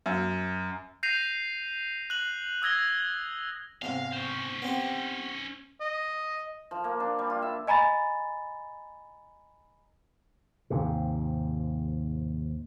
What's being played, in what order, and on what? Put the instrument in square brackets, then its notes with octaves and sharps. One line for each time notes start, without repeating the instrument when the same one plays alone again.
[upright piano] F#2
[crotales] G6 A#6 C7 D#7 F7
F#6 F#7
D#6 E6 G#6 A#6 G7
[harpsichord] E2 G#2 C3 [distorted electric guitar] F5
[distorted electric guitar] C#4 C5
[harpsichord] B3 C4 G4
[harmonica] D#5
[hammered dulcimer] F3
A#3
D4
G3
F4
E5
[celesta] D#5 G#5 A#5 B5 A6
[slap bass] D#2 G#2 C3